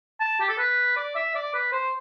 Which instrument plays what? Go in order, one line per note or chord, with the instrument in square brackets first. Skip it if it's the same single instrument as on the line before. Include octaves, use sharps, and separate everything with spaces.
[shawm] A5
G4
A4
B4
D5
E5
D5
B4
C5